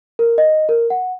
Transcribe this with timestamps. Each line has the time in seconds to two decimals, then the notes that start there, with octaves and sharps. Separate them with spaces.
0.19 A#4
0.38 D#5
0.69 A#4
0.90 F#5